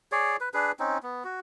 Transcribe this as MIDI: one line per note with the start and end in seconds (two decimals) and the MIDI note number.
0.12 0.37 68
0.12 0.37 73
0.12 0.37 74
0.41 0.49 71
0.54 0.72 62
0.54 0.72 68
0.54 0.72 71
0.79 0.98 60
0.79 0.98 61
0.79 0.98 63
1.03 1.23 59
1.24 1.40 66